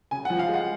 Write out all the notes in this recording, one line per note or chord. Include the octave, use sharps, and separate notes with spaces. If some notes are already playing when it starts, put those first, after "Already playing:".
C#3 G#5
F#5
F3
F5
G#3 F#5